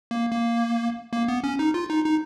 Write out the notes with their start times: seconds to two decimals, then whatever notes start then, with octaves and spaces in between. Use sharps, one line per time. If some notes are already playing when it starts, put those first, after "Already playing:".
0.11 A#3
0.32 A#3
1.13 A#3
1.28 B3
1.44 C#4
1.59 D#4
1.74 F4
1.90 D#4
2.05 D#4